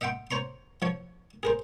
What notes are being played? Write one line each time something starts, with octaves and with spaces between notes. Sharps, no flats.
D#5 E5 F#5 G5 C6
C5 C#5 A#5 C6
F3 C#5
G#4 A#4 C5